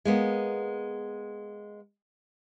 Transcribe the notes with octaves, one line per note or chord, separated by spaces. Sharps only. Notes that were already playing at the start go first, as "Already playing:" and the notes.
G#3 A#3 B3